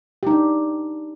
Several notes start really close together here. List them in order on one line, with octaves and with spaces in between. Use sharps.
G4 D#4 D4